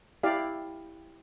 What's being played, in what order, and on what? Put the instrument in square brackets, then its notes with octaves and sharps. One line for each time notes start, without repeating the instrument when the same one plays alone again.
[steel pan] E4 G4 D5 F5